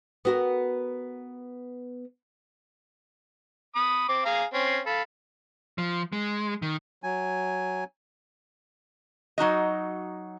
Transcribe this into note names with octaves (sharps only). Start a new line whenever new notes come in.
B3 F#4 A#4
B5 D#6
C4 D6
G#4 F5 A#5
C4 C#4
A4 F5 B5
F3
G#3
D#3
F#3 G#5
F#3 D#4 F#4 D#5